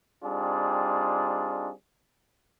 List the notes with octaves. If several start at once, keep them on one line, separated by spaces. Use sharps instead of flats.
G3 C4 D4 D#4 F4 G#4